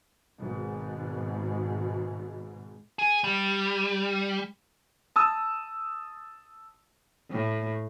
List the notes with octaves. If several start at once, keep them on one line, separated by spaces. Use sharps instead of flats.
G#1 G#2 B2
G#4
G3
A5 D#6 E6
A2